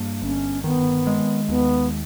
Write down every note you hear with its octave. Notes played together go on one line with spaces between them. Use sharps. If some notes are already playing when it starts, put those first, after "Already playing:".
Already playing: G2 A#3
G1 C#4
D#3 B3
G#3
D#2 B3